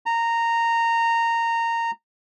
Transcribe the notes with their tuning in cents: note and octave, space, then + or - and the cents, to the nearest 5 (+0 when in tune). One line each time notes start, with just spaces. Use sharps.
A#5 -15